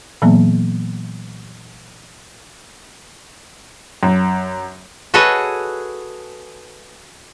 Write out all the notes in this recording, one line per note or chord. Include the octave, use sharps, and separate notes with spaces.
A#2 E3 F#3 A#3 B3
F#2
F#4 G#4 A4 B4 C#5 D#5